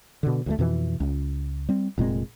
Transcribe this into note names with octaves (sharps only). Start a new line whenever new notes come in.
B2 D3
D2 G2 A3
F2 B2 E3
C#2
G3 C4
F1 A#2 G#3 C4